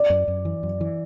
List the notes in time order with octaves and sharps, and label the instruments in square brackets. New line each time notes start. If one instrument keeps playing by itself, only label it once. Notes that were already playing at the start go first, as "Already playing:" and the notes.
Already playing: [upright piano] D5
[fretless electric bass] F#2
F#2
E3
F#2
E3